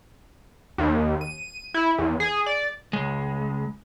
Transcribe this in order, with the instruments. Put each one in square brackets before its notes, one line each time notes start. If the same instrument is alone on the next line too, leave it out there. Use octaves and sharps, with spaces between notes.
[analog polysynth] D#2
D#7
E4
E2
G#4
D5
[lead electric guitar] C#2 G#3